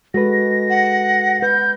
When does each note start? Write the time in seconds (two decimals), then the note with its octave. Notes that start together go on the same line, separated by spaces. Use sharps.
0.14 G#3 F#4 A4 B4 A#6
0.70 F#5
1.42 B4 G6